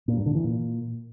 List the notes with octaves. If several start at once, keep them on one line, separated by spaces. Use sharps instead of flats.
A#2
G2
D3
E3
A#2